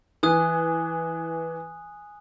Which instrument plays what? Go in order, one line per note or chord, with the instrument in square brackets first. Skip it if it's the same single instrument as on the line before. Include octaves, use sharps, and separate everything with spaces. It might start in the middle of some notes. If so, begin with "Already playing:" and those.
[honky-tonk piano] E3 [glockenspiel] G#5 D#6 F#6